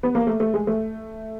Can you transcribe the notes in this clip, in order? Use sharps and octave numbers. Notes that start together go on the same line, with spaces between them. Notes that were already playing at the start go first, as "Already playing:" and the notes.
B3
A#3
A3
A3
G#3
A3